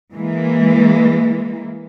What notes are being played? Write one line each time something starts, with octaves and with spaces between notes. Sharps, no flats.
E3 G#3 A#3